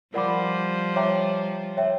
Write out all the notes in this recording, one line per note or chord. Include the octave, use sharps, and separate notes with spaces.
F3 G3 A#4 D5 F#5 B5 D6
C#5 E5 G5 A#5 D6
C#5 E5 G5